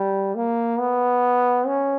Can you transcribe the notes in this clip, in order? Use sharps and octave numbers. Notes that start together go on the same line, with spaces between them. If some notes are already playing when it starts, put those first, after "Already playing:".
Already playing: G3
A#3
B3
C#4